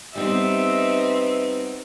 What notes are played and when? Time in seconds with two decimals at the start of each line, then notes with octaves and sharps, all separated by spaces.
0.15 G3 B3 C4 D#4 E5